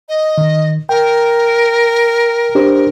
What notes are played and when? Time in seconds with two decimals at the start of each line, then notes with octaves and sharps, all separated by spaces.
0.09 D#5
0.38 D#3
0.89 A#4 G5
2.55 D4 G4 C5